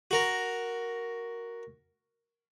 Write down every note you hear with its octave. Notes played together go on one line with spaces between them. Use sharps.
F#4 A#4